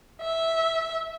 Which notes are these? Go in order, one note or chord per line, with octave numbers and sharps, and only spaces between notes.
E5